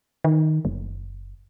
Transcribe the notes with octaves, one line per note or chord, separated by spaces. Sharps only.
D#3
F#1